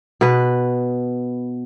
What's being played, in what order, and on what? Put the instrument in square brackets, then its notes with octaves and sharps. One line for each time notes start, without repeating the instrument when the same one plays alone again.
[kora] B2 B4